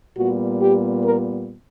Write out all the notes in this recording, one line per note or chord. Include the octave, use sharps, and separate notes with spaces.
A#2 G3 B3 F#4
G4
A#4